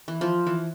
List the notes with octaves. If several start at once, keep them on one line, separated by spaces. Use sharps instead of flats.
E3
F3
E3